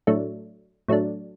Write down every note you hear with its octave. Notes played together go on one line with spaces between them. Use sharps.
A2 F#3 A3 D4
A2 F#3 A3 D4